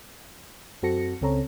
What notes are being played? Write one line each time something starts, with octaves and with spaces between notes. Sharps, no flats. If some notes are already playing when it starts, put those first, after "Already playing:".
F#2 C4 F#4 A4 A#6 C#7
C#2 C#3 C4 A4 C#5 A#5